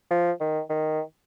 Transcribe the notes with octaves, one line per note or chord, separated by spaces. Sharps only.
F3
D#3
D#3